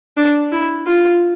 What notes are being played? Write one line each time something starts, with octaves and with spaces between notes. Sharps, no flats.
D4
E4
F4